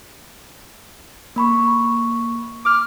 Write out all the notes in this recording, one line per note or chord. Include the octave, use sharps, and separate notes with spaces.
A#3 B5 C#6
D6 F6